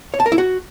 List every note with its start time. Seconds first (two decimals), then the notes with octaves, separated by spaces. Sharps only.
0.14 C#5
0.20 A5
0.26 A#4
0.32 E4
0.38 F#4